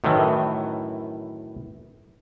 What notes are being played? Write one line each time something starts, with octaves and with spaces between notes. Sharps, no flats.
F#2 A2 D#3 E3